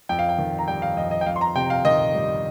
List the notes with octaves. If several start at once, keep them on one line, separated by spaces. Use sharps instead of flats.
F2 G5
F5
G5
D#3
A#5
G3 G5
F5
F2 D#5
D#5
G5
F2 F5
C6
A#5
C3 G5
F5
D#3 D#5
G3